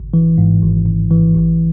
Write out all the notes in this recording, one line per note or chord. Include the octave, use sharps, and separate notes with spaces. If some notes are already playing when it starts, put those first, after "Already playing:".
Already playing: G#1
E3
G#2
G#1
G#1
E3
A1